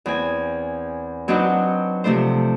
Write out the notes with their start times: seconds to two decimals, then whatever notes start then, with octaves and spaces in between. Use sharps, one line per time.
0.06 E2 C4 G#5
1.28 F#3 C4 D4 D#4 F#4 B4
2.04 C3 F3 A3 D4 C5